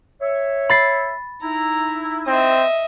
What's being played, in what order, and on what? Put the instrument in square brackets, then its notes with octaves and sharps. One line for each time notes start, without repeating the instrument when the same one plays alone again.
[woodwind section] C#5 E5
[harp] B5 A6 C7
[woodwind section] D#4 E4 [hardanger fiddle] A#5
[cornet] C4 [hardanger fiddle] D#5 E5